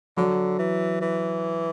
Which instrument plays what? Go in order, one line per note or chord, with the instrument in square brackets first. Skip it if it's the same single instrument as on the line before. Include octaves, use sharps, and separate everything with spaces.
[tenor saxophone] D3 [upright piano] F#3
[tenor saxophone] E3
E3